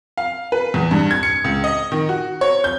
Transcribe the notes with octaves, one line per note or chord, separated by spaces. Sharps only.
F5
B4
E2
G2
G#6
C#7
C#2
D#5
D#3
F#4
C#5
G6